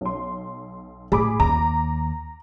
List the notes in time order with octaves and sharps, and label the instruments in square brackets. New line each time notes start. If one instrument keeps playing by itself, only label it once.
[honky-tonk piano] B1 C6
[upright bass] A2 [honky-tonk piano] G#4 B5 D6
[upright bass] D#2 [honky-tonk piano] A#5